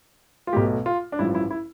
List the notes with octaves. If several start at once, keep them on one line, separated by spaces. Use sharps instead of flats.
F4
B1 B2 A3 G4
F4
D4
A1 G2 F3 E4
E4
E4